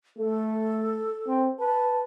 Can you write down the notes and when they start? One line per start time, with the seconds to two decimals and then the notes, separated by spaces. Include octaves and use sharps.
0.17 A3 A4
1.27 C4
1.60 B4 A5